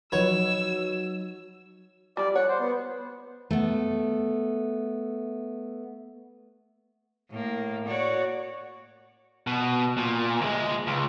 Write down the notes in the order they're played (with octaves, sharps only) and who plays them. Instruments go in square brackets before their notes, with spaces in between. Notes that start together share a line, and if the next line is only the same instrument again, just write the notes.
[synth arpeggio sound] F3 B4 [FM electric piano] F#3 D#4 F#4 [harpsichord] C#5 [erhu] E6
[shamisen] F3 G3 [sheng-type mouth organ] D5
[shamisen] C#5 [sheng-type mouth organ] F#5
[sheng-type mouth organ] C5
B3
[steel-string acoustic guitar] A3 B3
[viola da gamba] A2 A#3
F#4 C#5 D5
[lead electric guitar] B2
A#2
D2 G#3
C#2